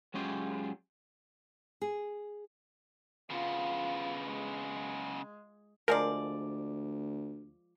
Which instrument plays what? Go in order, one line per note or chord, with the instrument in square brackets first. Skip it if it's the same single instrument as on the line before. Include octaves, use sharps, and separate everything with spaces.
[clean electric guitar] F#3 G#3 C#4 F4 G4 G#4
[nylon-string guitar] G#4
[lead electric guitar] C#3 B3 [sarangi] F4
[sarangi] G#3
[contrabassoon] D2 [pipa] F3 G#3 D5 [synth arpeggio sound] A#4